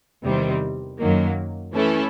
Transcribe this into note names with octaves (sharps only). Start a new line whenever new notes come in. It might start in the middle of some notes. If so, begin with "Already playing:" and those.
E2 C3 D#3 G3 C4
F#2 D#3 F#3 A#3
E3 A3 C#4 E4 A4